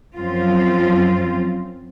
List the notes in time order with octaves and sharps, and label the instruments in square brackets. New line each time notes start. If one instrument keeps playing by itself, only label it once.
[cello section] F#2 F3 C4 F4